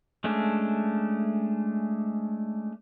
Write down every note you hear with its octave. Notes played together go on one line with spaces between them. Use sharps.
G#3 A3 C#4 D4